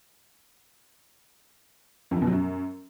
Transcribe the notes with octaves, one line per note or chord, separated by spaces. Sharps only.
F2
F#2
B2
F#3
F#2